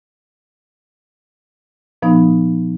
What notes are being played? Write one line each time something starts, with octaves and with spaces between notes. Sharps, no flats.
A#2 F3 B3 D#4